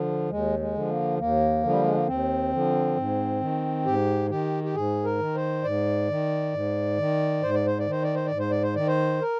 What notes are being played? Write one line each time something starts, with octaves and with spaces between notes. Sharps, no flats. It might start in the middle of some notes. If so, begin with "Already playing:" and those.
Already playing: D3 F3
D#2 G#3
G#3
D3 F3
A#3
D#2 A#3
D3 F3
G3
G#3
A#3
D#2 C4
D3 F3
G#2
D#3
G#2 G4
D#3 G4
G4
G#2 G#4
A#4
D#3
C5
G#2 D5
D#3
G#2
D#3
G#2 C5
D5
C5
D5
D#3 C5
D5
C5
D5
G#2
C5
D5
C5
D#3 D5
C5
A#4